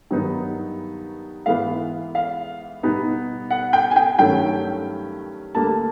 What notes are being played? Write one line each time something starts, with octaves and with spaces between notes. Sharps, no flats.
G2 D#3 F#3 B3 D#4
G#2 E3 G#3 B3 F5
F5
B2 G3 B3 D#4
F#5
G5
G#5
G5
G2 D#3 F#3 A3 C#4 G5
D2 D3 G3 A#3 A5